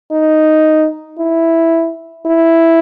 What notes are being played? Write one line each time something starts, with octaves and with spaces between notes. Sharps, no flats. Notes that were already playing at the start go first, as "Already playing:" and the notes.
D#4
E4
E4